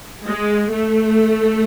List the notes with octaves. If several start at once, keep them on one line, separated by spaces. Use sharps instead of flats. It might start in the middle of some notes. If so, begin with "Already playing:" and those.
G#3
A3